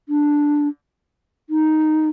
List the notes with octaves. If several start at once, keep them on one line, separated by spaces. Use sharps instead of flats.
D4
D#4